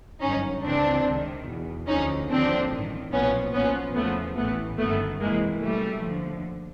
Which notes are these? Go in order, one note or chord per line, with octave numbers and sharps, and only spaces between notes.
G1 F#2 D#3 C#4 D#4
C#2 C#3 E3 C4 D4
C#2 C3 D#3
E2 B2
D2 D3 F3 C#4 D#4
D#2 D3 F3 C4 D4
A1 G2 D#3
B1 A#2 F3 B3 C#4
B1 A#2 F3 B3 C#4
E2 C#3 F3 A3 B3
A1 A2 E3 A3 B3
G1 F#2 D#3 A3 B3
F2 C3 E3 G#3 A#3
C#2 B2 G3 A3
D#2 D3 F3